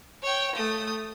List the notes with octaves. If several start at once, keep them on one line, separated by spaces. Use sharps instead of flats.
C#5 G5
A3 D#6